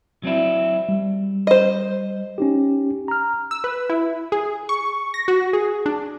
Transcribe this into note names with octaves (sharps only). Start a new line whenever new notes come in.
F#3 C4 D4 E4
G3
C5 D#5
C#4 D#4 G4
A#5 F6
E6
B4
E4
G#4
C#6
A#6
F#4
G#4
D4